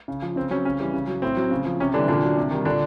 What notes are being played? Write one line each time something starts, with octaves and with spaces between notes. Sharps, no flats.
C#3
F3
C#3 C4
F#3 C#4
C#3 C#4
E3 G3
C#3
F#3
A2 C4
F#3
C#3
F3
C3 C#4
D3 E3 G3 D4
A#2 D3 D4
F#3
C3
D#3 G3
A#2 D3 D4